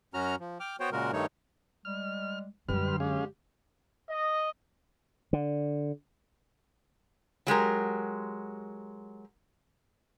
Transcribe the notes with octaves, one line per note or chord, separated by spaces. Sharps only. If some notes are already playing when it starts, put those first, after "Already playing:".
F#2 C#4 F#4 A#5 F6
F3
G5 D6 F6
B3 F#4 C5 C#5 G5
A#2 C#3 G#3 F#4 A#4
G2 D#3 G3 A3 D#4 C#5
G3 G#3 F6
F#2 D3 G3 G#3 B4 F6
G2 G5 C6
G#3 C#4 G4 G#4 F5
D#5
D3
F#3 G#3 G4 A#4